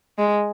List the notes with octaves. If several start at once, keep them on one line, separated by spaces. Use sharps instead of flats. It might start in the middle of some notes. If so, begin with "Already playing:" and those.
G#3